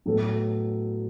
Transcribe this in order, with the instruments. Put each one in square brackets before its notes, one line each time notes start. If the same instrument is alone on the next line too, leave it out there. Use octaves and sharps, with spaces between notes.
[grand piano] A2 F#3 B3 F#4 A4